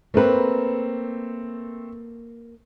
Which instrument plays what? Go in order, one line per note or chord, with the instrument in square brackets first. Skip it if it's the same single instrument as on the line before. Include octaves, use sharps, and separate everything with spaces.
[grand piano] A3 C4 [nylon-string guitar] A#3 A#4 B4